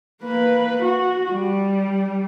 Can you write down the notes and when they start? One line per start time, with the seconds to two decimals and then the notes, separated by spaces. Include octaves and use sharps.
0.22 A#3 B4
0.82 F#4
1.31 G3